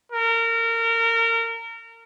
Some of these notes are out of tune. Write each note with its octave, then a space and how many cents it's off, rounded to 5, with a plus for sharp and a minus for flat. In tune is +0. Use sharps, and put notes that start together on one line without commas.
A#4 -25